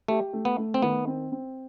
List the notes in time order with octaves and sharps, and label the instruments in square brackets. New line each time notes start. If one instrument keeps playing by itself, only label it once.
[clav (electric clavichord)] A3 [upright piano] G4
[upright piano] A3
[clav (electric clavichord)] B3
[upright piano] A3
[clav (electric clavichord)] C4
[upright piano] D#3 [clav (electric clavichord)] B3
[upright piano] C4
C4